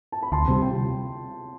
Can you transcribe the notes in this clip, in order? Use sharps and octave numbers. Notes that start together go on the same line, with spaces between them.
A5
B5
D2 A5 C6
C3 G3
G5